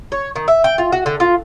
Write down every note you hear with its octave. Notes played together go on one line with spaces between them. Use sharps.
C#5
D#3
E5
G5
F4
F#4
D3
F4